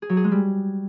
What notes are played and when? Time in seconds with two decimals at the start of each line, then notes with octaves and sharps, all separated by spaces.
0.02 G#4
0.09 F#3
0.17 G#4
0.24 G#3
0.31 G3